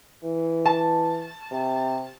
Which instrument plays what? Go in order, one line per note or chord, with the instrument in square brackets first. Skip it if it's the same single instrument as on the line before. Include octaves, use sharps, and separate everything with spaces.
[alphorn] E3
[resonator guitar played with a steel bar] A5
[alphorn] C3